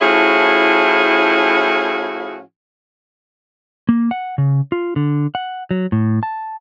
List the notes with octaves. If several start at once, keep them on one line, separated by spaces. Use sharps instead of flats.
A2 F3 C#4 E4 F#4 G#4
A#3
F#5
C#3
F4
D3
F#5
F#3
A2
A5